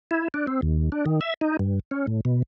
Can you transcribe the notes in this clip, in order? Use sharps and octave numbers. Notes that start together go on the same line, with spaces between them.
E4
D4
C4
D#2
D4
D#3
E5
D#4
G2
C#4
A2
B2